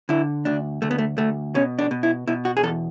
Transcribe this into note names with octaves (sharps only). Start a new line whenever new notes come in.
D3 E4
D2 D4
D2 A3
B3
A3
D2 A3
B2 C#4
D4
B2
E4
B2 E4
F#4
G#4
E2 A4